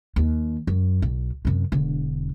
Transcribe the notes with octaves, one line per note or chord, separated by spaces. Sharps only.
D#2
F#2
B1
F#2 C3
E1 D3